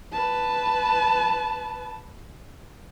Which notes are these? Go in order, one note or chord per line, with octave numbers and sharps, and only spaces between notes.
B4 A5